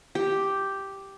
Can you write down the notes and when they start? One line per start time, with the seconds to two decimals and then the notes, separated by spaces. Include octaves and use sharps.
0.15 G4